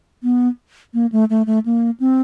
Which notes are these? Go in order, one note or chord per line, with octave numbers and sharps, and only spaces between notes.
B3
A#3
A3
A3
A3
A#3
C4